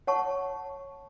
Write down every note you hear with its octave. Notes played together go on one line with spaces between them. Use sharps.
C#5 F#5 A5 C#6